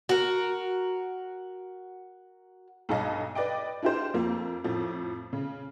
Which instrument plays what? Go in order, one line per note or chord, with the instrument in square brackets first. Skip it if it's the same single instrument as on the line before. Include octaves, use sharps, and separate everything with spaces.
[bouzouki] F#4 A#4
[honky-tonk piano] B1 G2 A4 C#5 D#5 F5
B4 D5 D#5 G5
D4 E4 F4 G4 C5
F2 F3 A#3
F2 A2 F3
C#3